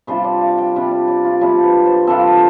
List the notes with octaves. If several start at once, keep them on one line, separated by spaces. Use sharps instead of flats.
C3 G3 D4 F4 C5
D5
F5
G5
C3 G3 D4 F4
D5
D5
F4
C3 G3 D4 F4 G4
B4
C5
C3 G3 D4 F4 A4